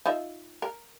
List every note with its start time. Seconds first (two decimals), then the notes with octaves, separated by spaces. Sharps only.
0.06 D#4 F4 E5
0.62 A#4